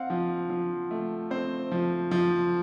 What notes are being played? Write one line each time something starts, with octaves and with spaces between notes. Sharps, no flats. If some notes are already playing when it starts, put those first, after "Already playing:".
Already playing: C4 F5 F#5
F3
F3
A3
C4 C5
F3
F3